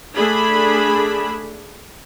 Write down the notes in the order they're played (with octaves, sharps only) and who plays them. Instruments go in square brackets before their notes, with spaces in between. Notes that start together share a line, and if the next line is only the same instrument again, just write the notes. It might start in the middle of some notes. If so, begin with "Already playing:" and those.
[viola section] A3 D4 G#4 B5